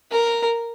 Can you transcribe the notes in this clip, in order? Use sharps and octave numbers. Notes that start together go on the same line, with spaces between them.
A#4